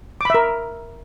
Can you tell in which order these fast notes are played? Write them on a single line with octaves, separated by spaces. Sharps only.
D6 B5 E5 A#4